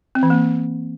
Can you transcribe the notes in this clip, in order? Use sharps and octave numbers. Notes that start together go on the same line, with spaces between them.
C4
E3
A#3